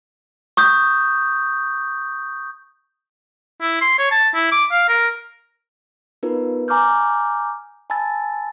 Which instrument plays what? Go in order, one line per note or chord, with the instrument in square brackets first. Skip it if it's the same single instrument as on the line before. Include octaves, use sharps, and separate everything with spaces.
[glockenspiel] C#6 D#6 G6
[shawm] E4
C6
C#5
A5
E4
D6
F5
A#4
[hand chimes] B3 D#4 F4 A#4 B4
G#5 A#5 D6 D#6 F6 G6
G#5 A5 B5 E6 A6